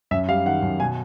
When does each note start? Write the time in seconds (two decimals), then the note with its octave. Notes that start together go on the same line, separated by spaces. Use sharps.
0.11 F#2 E5
0.29 G3 F5
0.45 D#3 F#5
0.62 F#2
0.80 B2 G#5